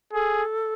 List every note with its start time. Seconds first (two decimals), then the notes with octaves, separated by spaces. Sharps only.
0.13 G#4 A4